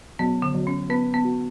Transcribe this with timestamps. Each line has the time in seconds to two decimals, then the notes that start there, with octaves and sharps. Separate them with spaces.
0.19 F#3 B3
0.42 D3
0.54 F#3
0.67 C#4
0.90 B3 B4
1.14 B3
1.25 F#4